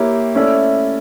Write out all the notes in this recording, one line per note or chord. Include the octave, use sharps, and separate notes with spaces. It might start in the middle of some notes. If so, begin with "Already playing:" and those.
Already playing: A#3 E4 G4 C#5
A3 C#4 E4 A4 D5